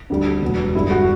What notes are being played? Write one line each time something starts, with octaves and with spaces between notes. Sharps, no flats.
D2 D3 G3
E1 E2 B2 F#3
G1 G2 D3 G3 E4
F#4